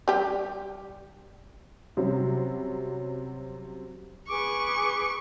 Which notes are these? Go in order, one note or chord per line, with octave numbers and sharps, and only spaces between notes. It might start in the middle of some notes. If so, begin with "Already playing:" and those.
G3 G4
C3 F#3 G3 C#4
G#4 B4 C#6 D6